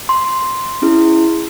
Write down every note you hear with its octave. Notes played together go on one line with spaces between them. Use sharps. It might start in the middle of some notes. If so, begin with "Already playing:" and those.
C6
C#4 E4 G#4